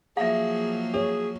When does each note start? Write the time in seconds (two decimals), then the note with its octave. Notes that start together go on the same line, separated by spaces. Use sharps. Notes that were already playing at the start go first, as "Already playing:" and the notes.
0.17 F3 F#3 A#3 G#4 E5 F5
0.94 G#4 C#5